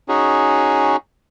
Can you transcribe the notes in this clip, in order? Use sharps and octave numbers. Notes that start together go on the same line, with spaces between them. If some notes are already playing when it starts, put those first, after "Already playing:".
C#4 D#4 F#4 G#4